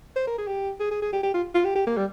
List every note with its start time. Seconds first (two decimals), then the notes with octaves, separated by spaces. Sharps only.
0.16 C5
0.27 A#4
0.38 G#4
0.48 G4
0.80 G#4
0.91 G#4
1.02 G#4
1.13 G4
1.23 G4
1.34 F4
1.55 F4
1.65 G4
1.75 G4
1.87 A#3
1.97 G3